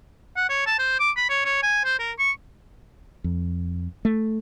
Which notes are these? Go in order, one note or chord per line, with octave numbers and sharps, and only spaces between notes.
F#5
C#5
A5
C5
D6
B5
C#5
C#5
G#5
C5
A#4
C#6
F2
A3